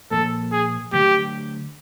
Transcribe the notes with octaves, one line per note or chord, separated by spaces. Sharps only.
A#2 F3 A#3 A4
G#4
D3 F#3 A3 G4